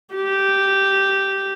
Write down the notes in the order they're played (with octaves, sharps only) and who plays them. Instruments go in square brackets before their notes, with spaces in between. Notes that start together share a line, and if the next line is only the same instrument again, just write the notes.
[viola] G4